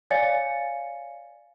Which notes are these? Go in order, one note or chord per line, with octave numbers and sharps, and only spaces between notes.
C#5 D5 F5 G#5 A6 C#7